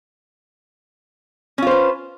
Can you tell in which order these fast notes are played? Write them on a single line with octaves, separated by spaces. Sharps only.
C#4 F4 C5 B4